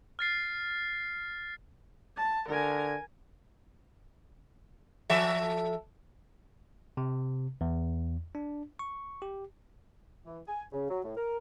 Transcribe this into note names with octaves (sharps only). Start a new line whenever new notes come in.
F6 A6 C7
A5
D3 A#4 G#5
F3 A4 E5
C3
E2
D4
C#6
G4
E3
G#5
C#3
F#3
A2
A#4